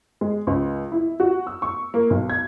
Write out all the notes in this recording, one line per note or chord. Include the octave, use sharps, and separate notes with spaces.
G#3
C#2
E4
F#4
E6
C#6
A#3
B1
G#6